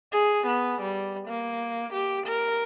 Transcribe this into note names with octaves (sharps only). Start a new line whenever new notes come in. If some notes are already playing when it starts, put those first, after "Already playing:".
G#4
B3
G3
A#3
G4
A#4